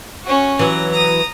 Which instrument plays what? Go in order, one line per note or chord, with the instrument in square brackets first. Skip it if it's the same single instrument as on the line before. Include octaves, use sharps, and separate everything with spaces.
[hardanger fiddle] C#4 F#4
[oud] E3 F#3 [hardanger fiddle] A#5
[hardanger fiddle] A#5 D#6